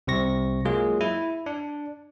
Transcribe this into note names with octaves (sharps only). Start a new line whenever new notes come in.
C2 C3 C4 C#6 A#6
F#3 G#3 A#3 F4 G#4
E4
D4